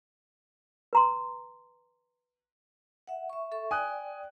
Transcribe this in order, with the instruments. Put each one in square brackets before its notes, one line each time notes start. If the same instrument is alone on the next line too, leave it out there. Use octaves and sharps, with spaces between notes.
[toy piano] B4 A#5 C6
[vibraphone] E5 F#5
E5 C#6
A4 E5 C#6
[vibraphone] D5 G5 [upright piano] G#5 D#6 F#6